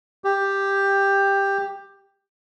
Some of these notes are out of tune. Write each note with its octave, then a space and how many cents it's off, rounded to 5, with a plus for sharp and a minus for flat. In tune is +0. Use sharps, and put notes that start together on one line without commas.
G4 +10